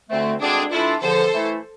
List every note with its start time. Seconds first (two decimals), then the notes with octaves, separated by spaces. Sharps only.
0.10 D2 D3 A3 C4
0.41 D2 D3 G#3 C4 D4 G#4
0.72 E3 A3 D4 E4 F4
1.02 E2 D3 F3 A4 C5
1.33 E3 A3 E4